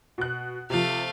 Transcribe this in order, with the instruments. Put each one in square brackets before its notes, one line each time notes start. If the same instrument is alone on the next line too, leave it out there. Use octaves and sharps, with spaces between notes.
[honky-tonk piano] B2 F#6
[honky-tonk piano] C3 F3 [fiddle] A3 F5